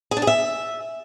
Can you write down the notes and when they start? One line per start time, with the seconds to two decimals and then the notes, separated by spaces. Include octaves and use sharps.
0.11 G#4
0.17 D4
0.22 G#4
0.27 E5